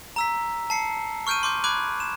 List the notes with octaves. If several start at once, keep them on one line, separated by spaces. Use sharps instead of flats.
A#5 E6 B6
A5 C7 C#7
C#6 F6 G6 D7 D#7
C6 D6 G6
B5 D6 F#6 G#6 D7 D#7
E7